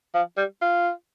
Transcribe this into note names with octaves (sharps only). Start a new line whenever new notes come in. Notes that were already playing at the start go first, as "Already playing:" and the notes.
F3
G3
F4